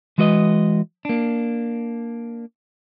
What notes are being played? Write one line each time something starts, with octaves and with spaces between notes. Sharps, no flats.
E3 G#3 F#4 B4 D#5
A#3 D4